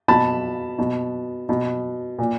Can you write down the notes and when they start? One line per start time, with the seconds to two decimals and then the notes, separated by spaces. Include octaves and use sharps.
0.08 B2 A5 B5
0.79 B2
1.49 B2
2.19 A#2